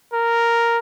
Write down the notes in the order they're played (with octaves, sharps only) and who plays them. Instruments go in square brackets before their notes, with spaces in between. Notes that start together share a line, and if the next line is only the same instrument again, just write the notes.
[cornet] A#4